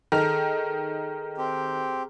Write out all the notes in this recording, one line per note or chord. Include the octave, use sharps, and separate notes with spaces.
D#3 G#4 A4 A#5 F6
C4 G4